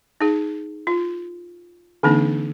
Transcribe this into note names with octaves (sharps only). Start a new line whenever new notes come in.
D#4 G#4
F4
D3 E3 A#3 C4 D4 D#4